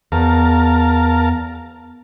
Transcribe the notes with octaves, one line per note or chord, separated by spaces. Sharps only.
E2 A#4 F5 A5